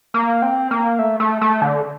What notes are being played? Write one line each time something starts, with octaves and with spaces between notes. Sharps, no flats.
A#3
C4
A#3
A3
A3
A3
D3